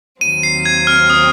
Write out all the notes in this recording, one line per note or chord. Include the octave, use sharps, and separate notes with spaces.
D#2 D#3 F#3 C4 D#7
C7
G#6
F6
D#6